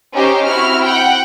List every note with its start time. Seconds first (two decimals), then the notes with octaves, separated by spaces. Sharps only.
0.14 C#4 D#4 G4 C5
0.47 C4 E4 F#4 F6
0.83 F#5 G5